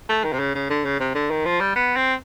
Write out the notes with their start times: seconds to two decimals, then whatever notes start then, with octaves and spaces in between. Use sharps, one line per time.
0.09 A3
0.24 D#3
0.33 C3
0.39 C#3
0.55 C#3
0.70 D3
0.85 C#3
1.00 C3
1.15 D3
1.31 D#3
1.45 F3
1.61 G3
1.76 B3
1.96 C4